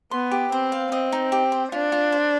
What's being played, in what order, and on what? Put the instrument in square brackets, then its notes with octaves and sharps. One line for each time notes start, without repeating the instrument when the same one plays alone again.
[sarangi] B3 [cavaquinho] C6
[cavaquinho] G4
[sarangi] C4 [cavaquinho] C5
[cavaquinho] F5
[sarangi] C4 [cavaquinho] D#5
[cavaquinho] D#4
G4
C5
[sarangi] D4 [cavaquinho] F4
[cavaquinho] F4
C5